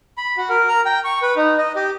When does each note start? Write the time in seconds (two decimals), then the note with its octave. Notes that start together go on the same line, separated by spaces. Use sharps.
0.18 B5
0.37 F#4
0.49 A#4
0.69 A#5
0.85 G5
1.04 C#6
1.22 B4
1.36 D#4
1.58 D#5
1.76 G4